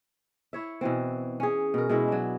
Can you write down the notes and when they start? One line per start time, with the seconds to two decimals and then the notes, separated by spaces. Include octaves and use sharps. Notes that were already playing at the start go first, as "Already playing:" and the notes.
0.53 E4 C#5 E5
0.81 B2 E3 C4
1.40 C#4 G#4
1.74 B2 A#4
1.89 B2 G#3 E4
2.08 F#3 D4